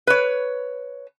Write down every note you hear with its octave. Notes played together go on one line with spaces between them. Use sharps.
B4 C#5